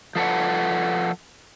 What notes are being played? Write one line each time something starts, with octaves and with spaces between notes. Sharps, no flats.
F3 A4 B4 F#5